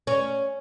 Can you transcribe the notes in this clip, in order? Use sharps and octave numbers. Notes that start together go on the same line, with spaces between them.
C#4